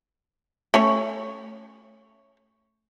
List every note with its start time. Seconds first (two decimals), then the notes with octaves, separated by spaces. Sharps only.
0.74 A3 C#4 C#5